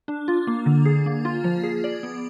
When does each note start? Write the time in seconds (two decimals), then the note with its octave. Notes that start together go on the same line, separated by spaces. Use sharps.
0.08 D4
0.28 F4
0.47 A#3
0.66 D3
0.85 G#4
1.06 A#3
1.25 F4
1.44 F3
1.63 G#4
1.84 D5
2.03 B3